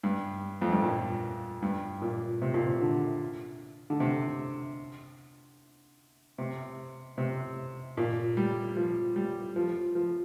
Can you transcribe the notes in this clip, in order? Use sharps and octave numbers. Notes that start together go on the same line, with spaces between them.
G2
F2
G2
A#2
G2
A#2
C3
A#2
C3
D3
D3
C3
C3
C3
A#2
G3
F3
G3
F3
F3